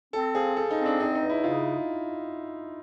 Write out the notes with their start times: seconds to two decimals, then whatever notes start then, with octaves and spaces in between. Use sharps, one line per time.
0.13 C4 A4
0.34 F3 G#4
0.56 F3 A4
0.71 D#4
0.79 C4
0.86 D4
1.00 E2 D#4
1.15 D#4
1.22 E2
1.29 E4
1.44 C#3 F4